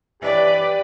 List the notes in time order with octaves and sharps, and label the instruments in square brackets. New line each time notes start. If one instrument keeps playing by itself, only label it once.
[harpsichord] E3 D4 C#5 [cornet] G4 [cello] B4 [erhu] D5